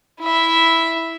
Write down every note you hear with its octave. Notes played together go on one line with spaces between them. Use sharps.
E4 E5